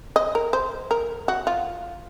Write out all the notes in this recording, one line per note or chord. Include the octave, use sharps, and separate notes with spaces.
D#5
A#4
C5
A#4
F#4
F4